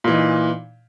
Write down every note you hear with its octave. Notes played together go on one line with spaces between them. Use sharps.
A#2 E3 D#4